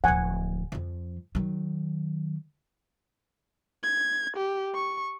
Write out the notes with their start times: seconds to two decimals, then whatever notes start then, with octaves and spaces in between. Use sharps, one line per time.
0.04 D1 F3 F#5 G#5
0.72 F2 F3
1.35 D#3 F#3
3.84 G#6
4.37 G4
4.75 C#6